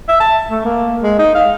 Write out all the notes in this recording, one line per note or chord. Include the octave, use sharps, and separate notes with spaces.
E5
A5
A3
A#3
G#3
D#4
F5